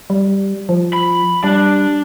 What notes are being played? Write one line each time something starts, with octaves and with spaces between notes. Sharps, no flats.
G3
F3
B5
G3 D4